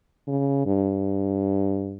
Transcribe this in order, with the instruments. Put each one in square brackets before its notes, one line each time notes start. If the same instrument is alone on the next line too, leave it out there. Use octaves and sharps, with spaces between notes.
[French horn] C#3
G2